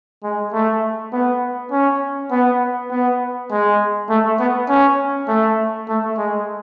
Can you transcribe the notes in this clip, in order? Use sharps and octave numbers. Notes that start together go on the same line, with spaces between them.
G#3
A3
B3
C#4
B3
B3
G#3
A3
B3
C#4
A3
A3
G#3